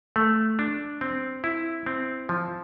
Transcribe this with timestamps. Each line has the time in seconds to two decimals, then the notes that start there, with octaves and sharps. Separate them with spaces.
0.16 A3
0.59 D4
1.01 C4
1.44 E4
1.86 C4
2.29 F3